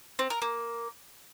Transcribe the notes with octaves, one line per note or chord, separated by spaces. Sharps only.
C4
A#4
A#3